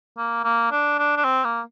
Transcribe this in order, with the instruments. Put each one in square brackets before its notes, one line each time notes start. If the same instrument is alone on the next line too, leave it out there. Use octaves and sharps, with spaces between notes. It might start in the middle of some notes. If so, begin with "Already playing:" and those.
[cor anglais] A#3
A#3
D4
D4
D4
C4
A#3